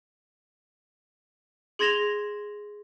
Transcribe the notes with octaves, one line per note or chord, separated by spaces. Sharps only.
G#4 C6 G#6 A#6 E7 F7